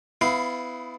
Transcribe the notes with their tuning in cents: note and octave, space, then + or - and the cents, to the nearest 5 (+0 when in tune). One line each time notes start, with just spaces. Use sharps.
B3 +30 E4 +0 F5 +0